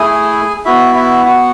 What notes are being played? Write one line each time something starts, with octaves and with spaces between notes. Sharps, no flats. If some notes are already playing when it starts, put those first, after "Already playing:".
Already playing: A3 E4 G#4 G#5
B3 E4 F#4 E5
E4 E5
F#4 F#5